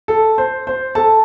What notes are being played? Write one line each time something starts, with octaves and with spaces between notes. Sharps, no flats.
A4
C5
C5
A4 A5